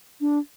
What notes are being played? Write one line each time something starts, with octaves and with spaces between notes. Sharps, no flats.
D4